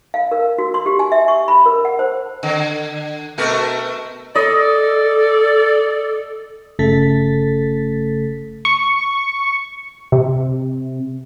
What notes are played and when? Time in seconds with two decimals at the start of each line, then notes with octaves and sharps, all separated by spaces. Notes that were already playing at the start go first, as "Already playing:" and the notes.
0.14 F5
0.32 A#4
0.58 F#4
0.74 C6
0.86 G4
0.99 G#5
1.12 E5
1.28 C#6
1.48 B5
1.66 A#4
1.85 F#5
1.99 C5
2.43 D3
3.38 B2 A3 A#4
4.36 A4 D5 D#5
6.79 G1 C#3 A3 A4 A6 B6
8.65 C#6
10.12 C3